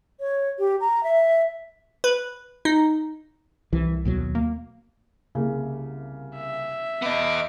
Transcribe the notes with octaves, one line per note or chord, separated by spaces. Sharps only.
C#5
G4
A#5
E5
B4
D#4
C2 E3
D#2 B2 F#3
A#3
C2 C#3 A#3
E5
E2 B3 D#5 D6